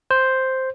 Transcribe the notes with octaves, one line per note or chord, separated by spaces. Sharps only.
C5